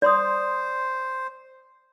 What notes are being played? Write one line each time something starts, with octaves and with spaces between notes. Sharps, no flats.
C5 D5 C6 D#6